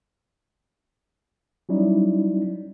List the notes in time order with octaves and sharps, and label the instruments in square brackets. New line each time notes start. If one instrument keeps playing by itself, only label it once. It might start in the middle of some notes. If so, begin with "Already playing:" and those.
[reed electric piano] F#3 G3 C#4 D#4 E4 D5